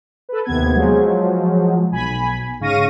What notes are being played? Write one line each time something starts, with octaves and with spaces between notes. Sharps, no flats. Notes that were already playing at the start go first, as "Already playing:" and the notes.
A4 B4
D#2 C3 B3 G#6
F3 F#3 G#3
B1 G#5 B5
G#2 C#3 F5 C#6 A#6 D#7